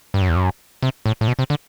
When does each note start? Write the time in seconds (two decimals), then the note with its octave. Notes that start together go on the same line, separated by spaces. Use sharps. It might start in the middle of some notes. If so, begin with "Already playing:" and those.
0.14 G2
0.22 F#2
0.29 E2
0.36 F#2
0.83 C3
1.06 A2
1.21 A2
1.28 B2
1.39 C3
1.50 D3